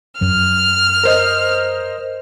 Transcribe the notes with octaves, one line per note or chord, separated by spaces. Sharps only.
F#2 F#3 F6
A#4 C5 D#5